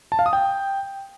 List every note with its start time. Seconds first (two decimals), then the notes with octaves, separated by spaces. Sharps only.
0.12 A5
0.19 F5
0.26 D#6
0.33 G5